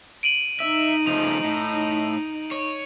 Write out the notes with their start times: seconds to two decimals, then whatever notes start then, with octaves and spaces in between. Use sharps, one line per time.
0.23 D7 D#7 F#7
0.60 D#4 E5
1.07 C#3 F3 A3 F7
1.44 A2
2.51 C#5